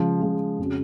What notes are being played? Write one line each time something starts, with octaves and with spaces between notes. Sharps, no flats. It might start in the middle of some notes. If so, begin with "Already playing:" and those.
Already playing: C#3 F3 G#3
C#3 F3 G#3
F2 C#3 G#3 C#4 F#4